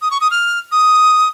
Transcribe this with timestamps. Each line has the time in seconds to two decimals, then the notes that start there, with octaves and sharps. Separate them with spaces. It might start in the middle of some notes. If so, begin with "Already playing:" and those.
0.02 D#6
0.11 C#6
0.21 D#6
0.31 F6
0.72 D#6